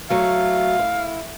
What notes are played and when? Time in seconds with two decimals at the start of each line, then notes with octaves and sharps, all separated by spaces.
0.10 F#3 A3 F5
0.79 E4